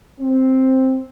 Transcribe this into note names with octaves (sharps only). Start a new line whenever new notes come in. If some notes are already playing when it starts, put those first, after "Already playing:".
C4